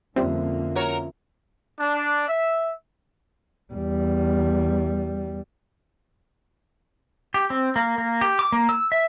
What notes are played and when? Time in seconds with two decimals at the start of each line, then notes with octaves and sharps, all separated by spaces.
0.16 F2 D3 G3 A#3 C4 C#4 F4 E5
0.76 F#4 A#4 C#5
1.80 D4
2.29 E5
3.73 E2 G3
7.34 G4
7.50 C4
7.76 A#3
7.98 A#3
8.21 G4
8.39 D6
8.52 A#3
8.69 E6
8.92 E5